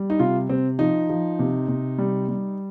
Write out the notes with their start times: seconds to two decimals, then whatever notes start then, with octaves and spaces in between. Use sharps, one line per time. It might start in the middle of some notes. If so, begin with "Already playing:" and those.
Already playing: G3
0.10 D#4
0.19 C3 F4
0.50 C3 C4
0.79 F3 D#4
1.10 F3
1.39 C3
1.68 C3
1.98 G3
2.29 G3